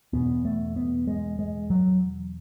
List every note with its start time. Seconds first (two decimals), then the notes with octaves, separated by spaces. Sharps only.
0.13 E2 B2 B3
0.45 A3
0.76 B3
1.07 G#3
1.39 G#3
1.70 F#3